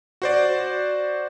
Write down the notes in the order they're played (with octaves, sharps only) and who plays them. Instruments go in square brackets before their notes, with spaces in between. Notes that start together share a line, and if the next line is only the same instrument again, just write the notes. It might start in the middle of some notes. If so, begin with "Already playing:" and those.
[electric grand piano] F#4 C5 D5